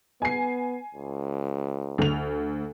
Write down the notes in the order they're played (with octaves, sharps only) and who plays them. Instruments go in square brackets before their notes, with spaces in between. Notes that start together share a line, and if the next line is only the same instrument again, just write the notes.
[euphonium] B3 [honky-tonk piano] G#5 C7
[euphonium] C#2
[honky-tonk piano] D2 F7